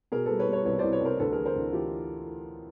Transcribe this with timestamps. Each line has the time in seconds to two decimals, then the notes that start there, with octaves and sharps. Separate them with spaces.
0.12 B2 G#4 A#4
0.26 G3 A4 B4
0.39 B4 C#5
0.48 G3
0.53 B4 C#5
0.65 C2 B4 C#5
0.79 C2 C5 D5
0.92 B4 C#5
1.01 C2 A#4 C5
1.19 D2 A4 B4
1.32 G#4 A#4
1.38 E3
1.46 A#4 C5
1.55 D2
1.72 E3 F4 G4